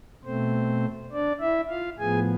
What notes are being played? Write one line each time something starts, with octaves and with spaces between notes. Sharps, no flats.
B2 A3 C4 C5
D4 D5
E4 E5
F4 F5
A2 F3 B3 G#4 G#5